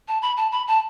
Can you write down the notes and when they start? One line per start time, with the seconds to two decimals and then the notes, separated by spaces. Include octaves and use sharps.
0.08 A5
0.22 B5
0.37 A5
0.52 B5
0.68 A5